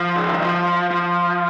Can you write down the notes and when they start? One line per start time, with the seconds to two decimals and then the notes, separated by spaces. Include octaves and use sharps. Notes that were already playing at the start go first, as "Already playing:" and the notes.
Already playing: F3
0.16 C#3
0.29 D#3
0.42 F3
0.91 F3